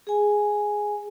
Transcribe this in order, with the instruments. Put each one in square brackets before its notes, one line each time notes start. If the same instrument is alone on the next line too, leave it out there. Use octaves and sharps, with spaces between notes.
[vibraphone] G#4 G#5